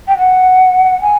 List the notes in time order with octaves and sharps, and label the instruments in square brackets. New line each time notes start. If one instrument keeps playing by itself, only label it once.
[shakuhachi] G5
F#5
G#5